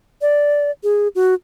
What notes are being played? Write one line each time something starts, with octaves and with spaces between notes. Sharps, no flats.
D5
G#4
F#4